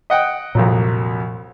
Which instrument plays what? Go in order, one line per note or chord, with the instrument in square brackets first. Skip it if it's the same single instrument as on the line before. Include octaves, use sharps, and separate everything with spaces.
[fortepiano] D#5 F#5 G5
[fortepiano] C2 F2 F#3 [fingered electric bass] A#2 F3